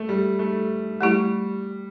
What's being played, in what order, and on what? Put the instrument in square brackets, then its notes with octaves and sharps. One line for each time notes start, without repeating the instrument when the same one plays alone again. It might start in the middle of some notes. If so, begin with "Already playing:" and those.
Already playing: [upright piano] A3
G3
A3
[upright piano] G3 [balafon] A3 E4 G4